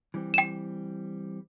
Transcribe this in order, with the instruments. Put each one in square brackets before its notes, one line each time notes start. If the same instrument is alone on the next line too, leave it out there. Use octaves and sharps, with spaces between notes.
[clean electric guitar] E3 G3 C4
[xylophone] G5 E7